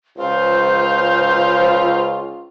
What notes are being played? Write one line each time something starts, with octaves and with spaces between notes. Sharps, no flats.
C#2 F4 C5